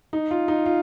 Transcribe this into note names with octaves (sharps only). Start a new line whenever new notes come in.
D#4
F4
D#4
F4